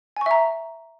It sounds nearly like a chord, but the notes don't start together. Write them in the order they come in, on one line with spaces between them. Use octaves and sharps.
G#5 C#6 E5 A#5